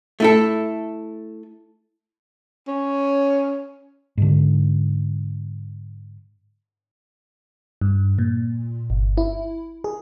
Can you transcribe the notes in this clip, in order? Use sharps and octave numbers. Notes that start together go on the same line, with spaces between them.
A3 E4 A4
C#4
G#2 D3
G2
A#2
G1
E4
G#4